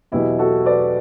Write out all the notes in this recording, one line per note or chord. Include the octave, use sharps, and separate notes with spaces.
E2 B2 F#3 E4 G4
F#4 A4
B4 D5